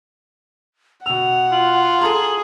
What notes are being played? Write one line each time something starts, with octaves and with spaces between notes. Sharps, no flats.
B2 F#5 E6 F7
F4 F#7
G#4 A4 A#5 C6 F#7